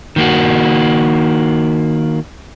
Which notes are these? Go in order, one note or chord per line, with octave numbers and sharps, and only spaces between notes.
D#3 A#3 F#4